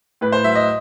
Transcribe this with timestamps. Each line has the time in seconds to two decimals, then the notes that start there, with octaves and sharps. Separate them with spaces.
0.21 A2 B4
0.32 C5
0.44 F#3 E5
0.55 D#5